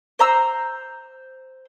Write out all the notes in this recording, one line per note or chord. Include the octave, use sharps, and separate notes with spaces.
C5 A#5 E6